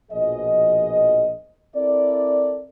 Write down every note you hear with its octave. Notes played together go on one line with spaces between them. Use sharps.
A#1 B2 F3 G#4 D#5
C4 E4 A4 A#4 D5